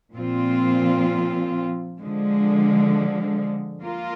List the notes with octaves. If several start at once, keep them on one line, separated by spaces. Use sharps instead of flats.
A#2 F3 C4 F4
D3 F3 G#3
A#3 F4 A#4